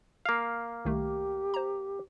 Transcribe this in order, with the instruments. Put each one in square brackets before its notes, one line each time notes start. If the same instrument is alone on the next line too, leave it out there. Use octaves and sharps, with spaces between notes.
[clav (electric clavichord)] A#3 F5
[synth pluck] C2 D#3 A3 [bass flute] G4
[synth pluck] C5 A#5